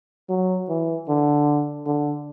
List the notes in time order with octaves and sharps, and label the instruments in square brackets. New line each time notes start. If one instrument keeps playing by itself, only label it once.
[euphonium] F#3
E3
D3
D3